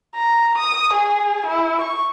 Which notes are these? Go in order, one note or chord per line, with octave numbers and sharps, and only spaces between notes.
A#5
D#6
G#4
E4
C#6